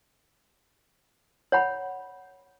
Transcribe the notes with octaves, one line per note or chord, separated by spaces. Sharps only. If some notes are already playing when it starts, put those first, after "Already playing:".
C#5 F#5 B5